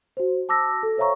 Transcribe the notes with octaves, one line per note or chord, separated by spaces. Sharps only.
F#4 C5
A5 D6 E6 A#6
A4
C5 C#5 E5 F5 A#5 C#6